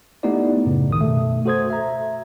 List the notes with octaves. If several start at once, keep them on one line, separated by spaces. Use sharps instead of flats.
A3 B3 D#4 E4 G4 D5
F#2 A2 C#3
C#2 D#3 D#6
F#2 B2 A3
F#4 A4 C5 D#6 G#6
E5 A#5